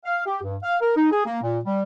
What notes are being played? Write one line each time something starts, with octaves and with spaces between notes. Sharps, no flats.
F5
G4
G2
F5
A#4
D#4
G#4
A#3
A#2
G3